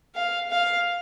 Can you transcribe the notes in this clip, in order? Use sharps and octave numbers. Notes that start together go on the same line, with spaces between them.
F5
F5